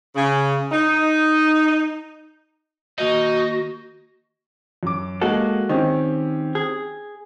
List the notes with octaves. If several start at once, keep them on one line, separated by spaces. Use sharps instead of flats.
C#3
D#4
D#3 A#3 D#4 F#4 D#5
F#2 D6
G#3 A#3 F#4 A4
D#3 C4 C#4 G4
G#4